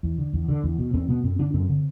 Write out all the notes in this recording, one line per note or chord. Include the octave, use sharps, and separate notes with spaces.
E2
D3
E2
D3
E2
B2
E2 C4
B2 B3
F#2 C4
D3 D4
F#2 C4
D3